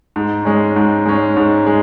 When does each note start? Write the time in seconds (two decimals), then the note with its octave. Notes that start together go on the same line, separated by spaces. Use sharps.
0.16 G#2
0.45 G#3 C#4
0.76 G#2
1.06 G#3 C#4
1.37 G#2
1.66 G#3